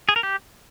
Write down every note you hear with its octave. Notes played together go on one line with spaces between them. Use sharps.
G#4
A#4
G4